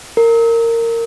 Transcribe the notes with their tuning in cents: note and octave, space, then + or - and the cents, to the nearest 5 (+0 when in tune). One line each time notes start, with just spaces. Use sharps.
A#4 -20